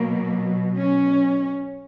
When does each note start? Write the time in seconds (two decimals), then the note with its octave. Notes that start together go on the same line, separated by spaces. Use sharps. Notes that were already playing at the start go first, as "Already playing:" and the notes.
Already playing: B2 F#3 A#3
0.77 C#4